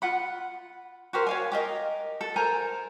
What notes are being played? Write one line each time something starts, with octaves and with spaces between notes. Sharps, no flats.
F4 F#5 B5
F#4 G4 A#4 C5
C#5 F5 G#5
G4 A#4 D#5
A4
A#4 C5 G#5 A#5